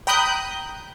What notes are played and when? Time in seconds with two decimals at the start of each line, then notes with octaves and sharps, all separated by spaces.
0.07 G5 A#5 B5 D#6 F#6 G6